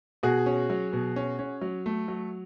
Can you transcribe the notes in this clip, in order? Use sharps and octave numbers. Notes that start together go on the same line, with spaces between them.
B2 F#4 G#4
C#4
F#3
B2
C#4
C#4
F#3
A3
F#3